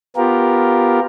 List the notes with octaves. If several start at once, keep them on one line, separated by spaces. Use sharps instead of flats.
B3 F4 G4 A#4